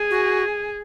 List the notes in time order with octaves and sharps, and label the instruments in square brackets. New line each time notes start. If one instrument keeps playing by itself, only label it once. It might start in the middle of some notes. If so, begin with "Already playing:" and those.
Already playing: [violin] G#4
[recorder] F#4